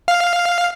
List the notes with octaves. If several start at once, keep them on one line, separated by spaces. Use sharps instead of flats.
F5